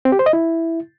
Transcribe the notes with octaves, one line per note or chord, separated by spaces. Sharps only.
C4
G4
C5
D#5
E4